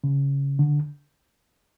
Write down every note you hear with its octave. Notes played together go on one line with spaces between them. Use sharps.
C#3
D3